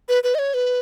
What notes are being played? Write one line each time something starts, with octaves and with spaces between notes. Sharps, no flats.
B4
B4
D#5
C#5
B4